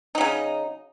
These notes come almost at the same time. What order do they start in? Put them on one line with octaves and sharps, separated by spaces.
D#4 F#3 C#3